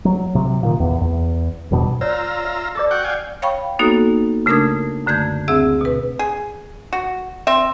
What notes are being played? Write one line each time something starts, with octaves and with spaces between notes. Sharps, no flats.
F#3
C3 F#3
A#2 D#3
E2
E2
D#1 E2 G2 B2
F4 C#5 D5 A#5 E6
E5
A4 D5 D6 E6
F#4 F#5 G5
F5 G5 G#5
C#5 F5 G5 B5 C#6
A#3 B3 D#4 F#4 A4
C#3 A3 D4 A#4 D#6 G#6
F#2 D3 A3 G6 G#6
D2 C4 G#4 E5 E6
B2 B4
G#4
F#4
C4 E5